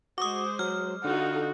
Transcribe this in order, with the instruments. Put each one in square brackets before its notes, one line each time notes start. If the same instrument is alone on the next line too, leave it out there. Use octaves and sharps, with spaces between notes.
[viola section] G#3 C5 [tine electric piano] F#4 [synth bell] D6 D#6
[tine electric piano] F#3 [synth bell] F6
[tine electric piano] D3 [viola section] D#4 F4 A4 [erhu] F#4